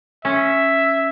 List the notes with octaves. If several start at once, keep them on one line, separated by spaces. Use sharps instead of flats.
C#4 E5